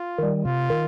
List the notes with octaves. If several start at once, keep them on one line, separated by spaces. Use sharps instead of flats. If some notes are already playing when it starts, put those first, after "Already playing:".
Already playing: F4
D#3 G3
C3 F4
D#3